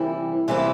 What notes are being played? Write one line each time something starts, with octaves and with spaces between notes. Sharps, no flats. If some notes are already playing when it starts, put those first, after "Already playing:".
Already playing: C3 E3 G3 A#3 E4
C3 E3 G3 A#3 E4